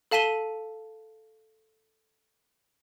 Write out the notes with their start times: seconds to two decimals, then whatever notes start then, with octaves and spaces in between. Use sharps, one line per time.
0.11 A4 F5 A5 B6 D#7 G7